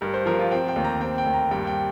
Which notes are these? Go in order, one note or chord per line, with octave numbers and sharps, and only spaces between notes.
G2 A#4
C5
F3 A#4
F4
C4 G5
G5
D#2
A#5
C4 G5
G5
D#2
A#5
G2 G5
G5